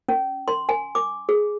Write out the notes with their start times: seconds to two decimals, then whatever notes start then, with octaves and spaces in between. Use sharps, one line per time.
0.09 C#4
0.48 C6
0.69 G#5
0.95 D6
1.29 G#4